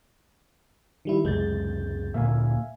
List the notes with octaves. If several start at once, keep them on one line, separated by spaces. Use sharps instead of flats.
D#3 G3 E4
C#2 F#2 C3 G#3 G6 A6
D2 A#2 A#3 E5 F5 G#5